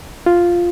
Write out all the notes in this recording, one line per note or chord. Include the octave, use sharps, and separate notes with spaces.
F4